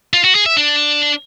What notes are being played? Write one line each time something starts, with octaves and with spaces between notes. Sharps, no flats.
F4
F#4
G#4
E5
D4